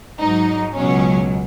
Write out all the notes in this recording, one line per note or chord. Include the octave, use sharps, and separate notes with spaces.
G#2 F#3 D#4
C#2 B2 F#3 C#4